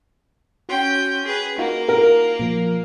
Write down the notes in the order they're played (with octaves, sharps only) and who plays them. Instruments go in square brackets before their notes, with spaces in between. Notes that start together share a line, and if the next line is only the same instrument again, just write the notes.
[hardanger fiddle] C#4 G5 [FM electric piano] F#4 C6
[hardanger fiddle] G#4 B4
[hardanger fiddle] A#3 [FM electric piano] D#4 F4 F#4
[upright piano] A#4
[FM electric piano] A#2 F3